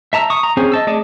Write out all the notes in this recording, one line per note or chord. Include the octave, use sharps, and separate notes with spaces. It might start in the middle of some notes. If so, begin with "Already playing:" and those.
E5 A5 A#5 E6
C#6 D#6
A#5
C4 C#4 G#4 C5 G#5
D#5 A5 E6
A3 G#4 D5 D#5 A5